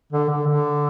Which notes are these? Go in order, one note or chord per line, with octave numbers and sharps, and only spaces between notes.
D3
D3
D3